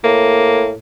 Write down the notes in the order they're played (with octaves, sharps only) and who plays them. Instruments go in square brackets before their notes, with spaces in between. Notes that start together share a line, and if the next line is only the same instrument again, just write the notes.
[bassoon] A2 [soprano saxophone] A#3